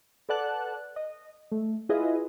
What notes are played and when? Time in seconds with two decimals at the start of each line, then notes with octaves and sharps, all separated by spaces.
0.29 A4 B4 D5 F#5 A5 F#6
0.96 D#5
1.52 A3
1.89 E4 F4 G#4 B4 D#5 E5